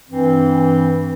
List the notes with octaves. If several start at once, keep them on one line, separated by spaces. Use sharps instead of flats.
G2 E3 C4